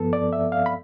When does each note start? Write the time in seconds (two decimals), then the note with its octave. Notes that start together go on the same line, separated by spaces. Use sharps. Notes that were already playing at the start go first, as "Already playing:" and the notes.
Already playing: G2 F3 B3 A4
0.13 D5
0.33 E5
0.52 F5
0.66 B5